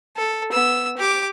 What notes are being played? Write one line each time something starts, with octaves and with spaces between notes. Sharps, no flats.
A4
B3 E6
G4 D6